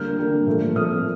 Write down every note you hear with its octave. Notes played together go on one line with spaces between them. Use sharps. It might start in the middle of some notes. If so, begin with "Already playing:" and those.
Already playing: D3 G3 A#3 F6 G6
D3 G3 A#3
A#2 F3 A3
A#2 F3 A3 D#6 F6